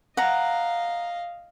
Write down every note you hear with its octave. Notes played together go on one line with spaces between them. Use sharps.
D#5 F5 F#5 A#5